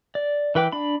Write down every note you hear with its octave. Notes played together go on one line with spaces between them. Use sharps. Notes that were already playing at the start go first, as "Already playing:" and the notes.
D5
E3 B4 G5 D6
D4 B5